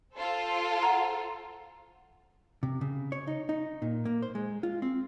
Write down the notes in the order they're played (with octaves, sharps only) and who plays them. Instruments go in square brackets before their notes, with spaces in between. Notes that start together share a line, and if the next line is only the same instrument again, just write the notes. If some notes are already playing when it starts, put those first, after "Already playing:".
[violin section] F4 A4 C5
[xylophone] F#5 A#5
[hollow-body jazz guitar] C3
C#3
C#5
D#4
D#4
A#2
A#3
C5
G#3
F4
C4